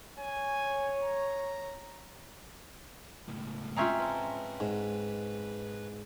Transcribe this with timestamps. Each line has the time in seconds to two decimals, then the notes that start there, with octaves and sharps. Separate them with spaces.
0.19 C#5 G#5
1.03 A#5
3.28 C#2 A2
3.76 G#3 C4 C#4 F4 E5 A#5
3.99 B4 A5
4.60 G#2